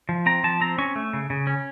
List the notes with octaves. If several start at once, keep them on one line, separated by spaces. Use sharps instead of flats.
F3
C4 A#5
F3 A5
C4 A#5
C#4 C#6
A3
C#3
C#3
C#4